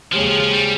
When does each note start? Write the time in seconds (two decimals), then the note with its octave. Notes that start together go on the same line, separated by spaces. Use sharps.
0.13 D#2 C#3 F3 G#3 C#4 G4
0.27 F3
0.40 F3
0.52 G3